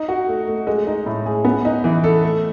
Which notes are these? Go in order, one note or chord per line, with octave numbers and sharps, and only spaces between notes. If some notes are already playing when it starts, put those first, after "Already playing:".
Already playing: D#4
F#4
A3
A3
G#3
D#4
A2
G#4
B3
D#4
E3
A4
A3